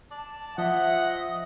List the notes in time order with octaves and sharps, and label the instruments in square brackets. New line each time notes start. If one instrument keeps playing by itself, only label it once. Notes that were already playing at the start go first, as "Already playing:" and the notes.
[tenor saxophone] D5 [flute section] A5
[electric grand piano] F3 [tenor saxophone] D#5 [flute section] E5 [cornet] F#5